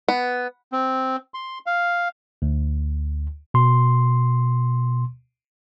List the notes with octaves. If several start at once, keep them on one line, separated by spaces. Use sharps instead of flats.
B3
C4
C6
F5
D2
B2 C6